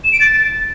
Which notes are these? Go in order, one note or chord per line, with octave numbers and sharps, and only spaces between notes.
E7
D7
A6